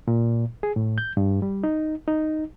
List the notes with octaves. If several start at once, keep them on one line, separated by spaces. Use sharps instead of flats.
A#2
G#4
A2
G6
G2
G3
D#4
D#4